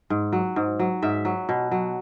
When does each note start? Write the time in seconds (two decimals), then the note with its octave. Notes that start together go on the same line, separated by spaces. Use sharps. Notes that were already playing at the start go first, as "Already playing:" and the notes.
0.10 G#2
0.33 F#3
0.56 G#2
0.79 F#3
1.02 G#2 E5
1.25 F#3
1.49 B2
1.71 F#3